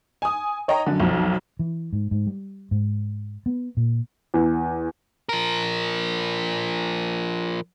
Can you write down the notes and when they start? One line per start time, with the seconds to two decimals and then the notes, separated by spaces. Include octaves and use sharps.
0.22 G#5 D#6
0.68 C#5 D#5 G5 A#5
0.86 F#2 D3
1.00 B1 F2
1.59 E3
1.93 G#2
2.11 G#2
2.27 G3
2.71 G#2
3.46 B3
3.77 A#2
4.34 E2
5.29 F3 A#4